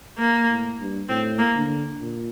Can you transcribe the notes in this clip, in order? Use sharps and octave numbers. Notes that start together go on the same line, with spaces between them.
A#3
A2
G2
A2 C4
A#3
D3
A#2